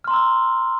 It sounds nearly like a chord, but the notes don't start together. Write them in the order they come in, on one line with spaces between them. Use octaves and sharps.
F6 C6 A#5 E6